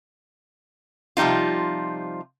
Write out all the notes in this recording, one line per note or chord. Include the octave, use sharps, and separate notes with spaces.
C3 F3 G3 D#4 F4